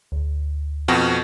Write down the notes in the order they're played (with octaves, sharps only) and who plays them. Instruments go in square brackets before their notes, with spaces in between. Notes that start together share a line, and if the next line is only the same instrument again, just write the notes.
[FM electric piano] D2
[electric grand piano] F2 B2 F#4 [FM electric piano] C4 F6